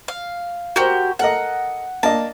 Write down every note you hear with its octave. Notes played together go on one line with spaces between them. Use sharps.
F5
F#4 G4 A#4 C5
A4 A#4 D#5 F#5
A#3 D4 D#5 A5